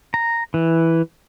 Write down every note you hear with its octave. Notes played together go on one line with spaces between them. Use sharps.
A#5
E3